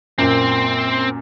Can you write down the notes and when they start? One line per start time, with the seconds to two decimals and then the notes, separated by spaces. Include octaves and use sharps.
0.18 F#2 A#2 C4